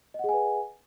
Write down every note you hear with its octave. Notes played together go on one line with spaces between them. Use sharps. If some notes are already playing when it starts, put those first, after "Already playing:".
G#4 B4 D#5 F#5 G#5